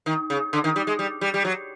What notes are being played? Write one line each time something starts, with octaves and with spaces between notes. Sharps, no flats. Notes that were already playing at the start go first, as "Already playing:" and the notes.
D#3
C#3
D3
D#3
G3
G#3
G3
G3
G3
F#3